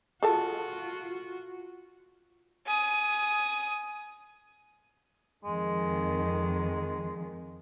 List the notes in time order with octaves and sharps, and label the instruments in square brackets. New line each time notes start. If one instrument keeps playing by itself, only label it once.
[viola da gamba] F4 F#4 [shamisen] G#4 A4 A5
[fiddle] G#5 D#6
[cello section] F2 D#3 [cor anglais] G#3